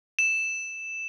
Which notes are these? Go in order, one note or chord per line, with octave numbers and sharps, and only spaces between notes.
E7